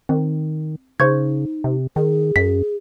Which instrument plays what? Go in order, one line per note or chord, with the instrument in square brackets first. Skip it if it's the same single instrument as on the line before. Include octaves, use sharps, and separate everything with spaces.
[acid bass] D#3 [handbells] C4
[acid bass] C#3 [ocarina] D#4 [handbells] C5 C#6 G#6
[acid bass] C3
[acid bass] D#3 [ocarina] G#4
[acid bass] F#2 [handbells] B6